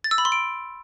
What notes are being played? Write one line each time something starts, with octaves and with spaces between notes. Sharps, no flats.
A6
E6
B5
C6
D7